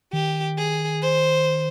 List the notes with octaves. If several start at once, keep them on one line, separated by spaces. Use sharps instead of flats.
D#3 G4
G#4
C5